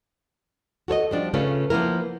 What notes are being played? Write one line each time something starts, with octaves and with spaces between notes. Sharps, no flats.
F#4 A4 C#5 D#5
F3 G3 D4
C#3 A3 C#4 F4 G#4 B4
F3 A#3 B3 E4 A#4